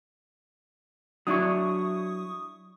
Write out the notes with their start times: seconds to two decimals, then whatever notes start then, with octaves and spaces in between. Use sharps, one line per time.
1.27 F#3 D4 E4 C#6 D#6